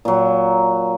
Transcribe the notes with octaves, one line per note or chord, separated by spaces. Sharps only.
A#2 F#3